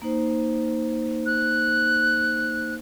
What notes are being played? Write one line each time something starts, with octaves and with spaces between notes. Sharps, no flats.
A#3 D#4 C5
F#6